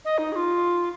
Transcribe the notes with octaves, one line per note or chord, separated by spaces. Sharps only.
D#5
D#4
G#4
F4